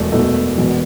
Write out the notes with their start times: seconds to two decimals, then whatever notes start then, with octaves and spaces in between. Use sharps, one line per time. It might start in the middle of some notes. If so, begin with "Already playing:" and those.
Already playing: E1 E2 B2 A3
0.12 E1 E2 B2 A3
0.58 E1 E2 B2